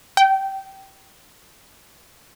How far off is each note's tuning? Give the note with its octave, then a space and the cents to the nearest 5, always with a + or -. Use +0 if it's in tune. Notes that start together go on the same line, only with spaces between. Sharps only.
G5 -20